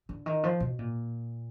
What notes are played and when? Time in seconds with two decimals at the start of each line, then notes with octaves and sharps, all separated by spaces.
0.09 D3
0.26 D#3
0.43 F3
0.60 B2
0.79 A#2